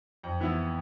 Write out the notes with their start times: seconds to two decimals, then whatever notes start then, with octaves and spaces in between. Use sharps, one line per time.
0.23 F2
0.40 E3 B3 E4